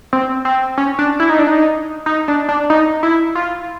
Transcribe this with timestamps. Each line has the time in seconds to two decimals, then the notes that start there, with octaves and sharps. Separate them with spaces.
0.13 C4
0.45 C4
0.78 C#4
0.99 D4
1.20 E4
1.30 D#4
1.39 D4
1.47 D#4
2.06 D#4
2.28 D4
2.49 D4
2.70 D#4
3.03 E4
3.35 F4